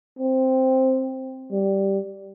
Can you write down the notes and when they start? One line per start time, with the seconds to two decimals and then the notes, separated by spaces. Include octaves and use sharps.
0.19 C4
1.52 G3